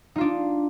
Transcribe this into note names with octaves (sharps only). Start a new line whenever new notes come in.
D4 D#4 F4